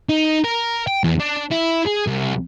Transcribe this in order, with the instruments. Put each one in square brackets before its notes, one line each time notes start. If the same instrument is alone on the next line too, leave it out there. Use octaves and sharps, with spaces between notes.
[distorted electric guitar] D#4
A#4
G5
E2
D4
E4
G#4
C2